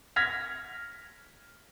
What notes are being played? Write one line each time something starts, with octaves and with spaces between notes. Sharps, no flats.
F6 G#6 A#6 B6 F7